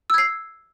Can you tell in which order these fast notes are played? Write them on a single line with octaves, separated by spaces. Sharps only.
E6 G#6 C7